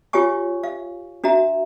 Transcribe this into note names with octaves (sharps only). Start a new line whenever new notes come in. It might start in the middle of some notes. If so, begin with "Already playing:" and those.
F4 G4 C#5 G#5 C#6
F5
D4 F#4 E5 A#5